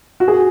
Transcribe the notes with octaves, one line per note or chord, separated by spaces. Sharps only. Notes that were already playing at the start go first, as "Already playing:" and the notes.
F#4
G#4